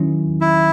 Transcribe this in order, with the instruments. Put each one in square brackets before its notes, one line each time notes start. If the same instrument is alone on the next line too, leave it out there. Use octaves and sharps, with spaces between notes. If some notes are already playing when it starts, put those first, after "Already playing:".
Already playing: [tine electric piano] D#3 F#3 C#4 E4
[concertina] E4